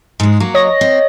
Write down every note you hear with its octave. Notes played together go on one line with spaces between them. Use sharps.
G#2 G#3
F#3 A#3 F#4
C#5 D#5 A#6
C4